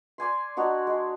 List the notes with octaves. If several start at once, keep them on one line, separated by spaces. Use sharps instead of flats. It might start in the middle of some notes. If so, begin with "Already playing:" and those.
D5 G#5 C6
D4 F#4 D#5 A#5
G#3